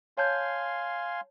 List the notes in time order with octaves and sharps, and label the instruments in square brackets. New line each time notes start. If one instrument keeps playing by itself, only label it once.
[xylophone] C#5 A5 G6 [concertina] F5 G#5 C6